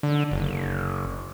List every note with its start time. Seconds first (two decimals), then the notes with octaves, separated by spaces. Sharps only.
0.03 D3
0.32 F#1